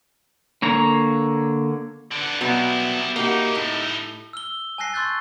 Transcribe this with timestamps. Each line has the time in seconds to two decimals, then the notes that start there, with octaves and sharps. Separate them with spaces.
0.62 D3 A#3 C#5 A#5
2.11 D3 B3
2.41 B2 F#3 G3 B3 E4
3.16 A#3 D#4 E4 F#4 G4
3.55 A2
4.33 E6 F6 G7
4.78 G#5 A5 E6 F#6 A#6 C7
4.94 C6 C#6 E6 F#6 G6 A6